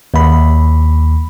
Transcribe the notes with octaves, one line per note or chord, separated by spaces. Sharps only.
D#2 B5